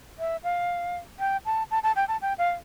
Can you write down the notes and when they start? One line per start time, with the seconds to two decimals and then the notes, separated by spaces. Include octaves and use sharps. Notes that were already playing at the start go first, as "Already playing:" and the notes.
0.19 E5
0.44 F5
1.19 G5
1.46 A5
1.71 A5
1.83 A5
1.96 G5
2.08 A5
2.22 G5
2.38 F5